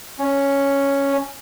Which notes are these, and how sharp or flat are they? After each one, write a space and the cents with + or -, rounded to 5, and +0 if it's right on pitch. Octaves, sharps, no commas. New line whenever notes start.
C#4 +0